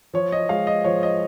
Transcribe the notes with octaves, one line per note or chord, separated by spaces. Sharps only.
F3 C#5
D#5
G#3 F5
D#5
F3 C#5
D#5